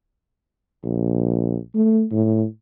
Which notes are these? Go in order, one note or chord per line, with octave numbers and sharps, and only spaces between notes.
A#1
A3
A2